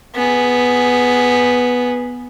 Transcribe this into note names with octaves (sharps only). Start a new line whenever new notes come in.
B3 G#4